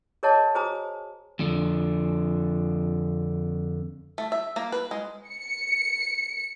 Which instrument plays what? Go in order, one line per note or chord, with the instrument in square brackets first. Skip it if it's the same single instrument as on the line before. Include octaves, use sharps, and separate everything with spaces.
[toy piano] G#4 A#4 C#5 D#5 F#5 A5
F#4 G#4 C5 G#5 A#5 D#6
[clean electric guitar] F2 D3
[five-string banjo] A3
E5
A#3
B4
G#3
[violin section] C#7